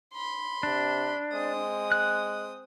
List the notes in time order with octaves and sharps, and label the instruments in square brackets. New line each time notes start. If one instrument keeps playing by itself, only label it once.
[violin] B5 C6
[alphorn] C3 [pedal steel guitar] D4
[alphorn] G#3 [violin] C4 D#6
[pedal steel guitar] F#6